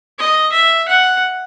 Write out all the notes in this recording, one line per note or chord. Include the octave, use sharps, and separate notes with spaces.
D#5
E5
F#5